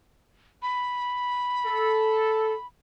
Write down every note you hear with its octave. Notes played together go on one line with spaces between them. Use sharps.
B5
A4